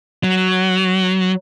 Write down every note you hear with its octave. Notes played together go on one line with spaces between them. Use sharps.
F#3